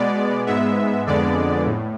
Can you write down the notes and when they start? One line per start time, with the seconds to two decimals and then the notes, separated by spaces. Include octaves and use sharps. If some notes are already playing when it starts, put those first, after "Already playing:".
Already playing: B2 G#3 B3 D5
0.46 G#2 G#3 B3 E5
1.07 F2 D3 G#3 B3 D5
1.67 A2